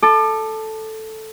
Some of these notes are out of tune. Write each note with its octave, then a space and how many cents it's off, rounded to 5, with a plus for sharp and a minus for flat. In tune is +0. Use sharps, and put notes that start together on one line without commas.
A4 +0 D6 +35